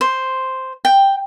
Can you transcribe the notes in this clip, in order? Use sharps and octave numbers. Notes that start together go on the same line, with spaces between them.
C5
G5